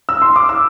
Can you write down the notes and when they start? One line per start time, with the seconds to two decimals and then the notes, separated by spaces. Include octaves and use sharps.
0.09 E6
0.22 C6
0.36 D6
0.49 E6